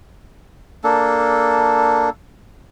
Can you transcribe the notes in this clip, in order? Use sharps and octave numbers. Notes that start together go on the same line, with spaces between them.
A#3 D4 A4